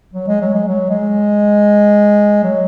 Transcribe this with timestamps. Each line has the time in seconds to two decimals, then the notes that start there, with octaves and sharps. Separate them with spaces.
0.13 F#3
0.28 G#3
0.41 F#3
0.54 G#3
0.68 F#3
0.90 G#3
2.44 F#3